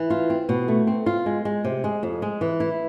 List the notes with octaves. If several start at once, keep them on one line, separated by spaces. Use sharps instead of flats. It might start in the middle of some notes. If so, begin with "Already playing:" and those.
Already playing: E3
F4
C4
B2
A3
C4
F4
G#3
G#3
C3
G#3
F2
G#3
E3
E4